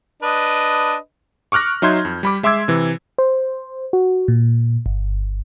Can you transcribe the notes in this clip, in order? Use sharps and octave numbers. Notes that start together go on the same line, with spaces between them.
D4 B4 D#5
C#6 D6 F6 F#6 A#6
F#3 D#4 E5 C6 G6 G#6
F2
G3 B5 D6
G#3 E5 C6 D6 E6 G#6
C3 E3
C5
F#4
A#2
G1